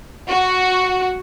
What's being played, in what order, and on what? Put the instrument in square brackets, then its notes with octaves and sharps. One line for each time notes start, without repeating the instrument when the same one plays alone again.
[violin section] F#4